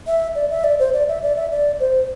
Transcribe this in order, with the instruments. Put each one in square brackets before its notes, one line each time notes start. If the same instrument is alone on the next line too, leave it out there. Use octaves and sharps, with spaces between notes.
[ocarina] E5
D5
E5
D5
C5
D5
E5
D5
E5
D5
C5